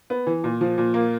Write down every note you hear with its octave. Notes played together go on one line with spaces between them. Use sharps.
B3
E3
A#2
F3
A#2
A#3